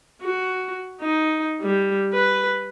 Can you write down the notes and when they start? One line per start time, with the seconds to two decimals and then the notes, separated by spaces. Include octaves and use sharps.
0.22 F#4
1.01 D#4
1.62 G3
2.14 B4